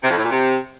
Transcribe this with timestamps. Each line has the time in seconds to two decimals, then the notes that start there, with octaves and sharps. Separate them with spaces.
0.03 C3
0.10 F2
0.17 A2
0.24 A#2
0.30 C3